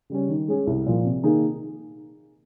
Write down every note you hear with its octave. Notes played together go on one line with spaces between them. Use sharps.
C#3 G3 C#4
D#3
G#3 C#4 G#4
C2
A#2 F3
C3
D#3 A#3 D#4 G#4